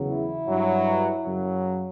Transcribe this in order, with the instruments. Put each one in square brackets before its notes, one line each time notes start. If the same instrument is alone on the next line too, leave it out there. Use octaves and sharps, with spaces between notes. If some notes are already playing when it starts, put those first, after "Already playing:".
Already playing: [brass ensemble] E2 C#3 F#3
E4
G2 F#3
F#2 C#3 F#3